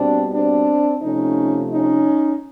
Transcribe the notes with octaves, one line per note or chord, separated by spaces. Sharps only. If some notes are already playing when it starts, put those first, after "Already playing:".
Already playing: B2 G3 C4 D4
C4 D4
C3 F3 A3 C#4 D#4
C#4 D#4